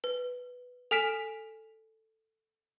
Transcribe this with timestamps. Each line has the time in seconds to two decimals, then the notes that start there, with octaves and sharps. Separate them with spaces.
0.04 B4
0.91 A4 G#5 F6 B6 D7 E7